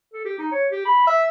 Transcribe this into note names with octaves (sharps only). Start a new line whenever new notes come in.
A4
G4
D#4
C#5
G4
B5
E5